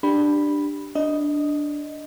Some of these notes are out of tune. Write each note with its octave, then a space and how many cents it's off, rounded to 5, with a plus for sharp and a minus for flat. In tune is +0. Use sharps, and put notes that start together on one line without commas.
D4 +10 G4 +0 B5 +0
D4 +0 D#5 +0